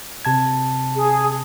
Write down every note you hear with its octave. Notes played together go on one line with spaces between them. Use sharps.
C3 A5 G#6
G#4